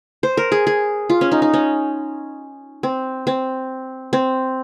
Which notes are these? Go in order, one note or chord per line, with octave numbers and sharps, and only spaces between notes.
C5
A#4
G#4
G#4
F4
C#4
D#4
D#4
C#4
C4
C4
C4